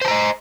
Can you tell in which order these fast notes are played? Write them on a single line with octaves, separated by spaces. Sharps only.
C5 A5 A#5 D#5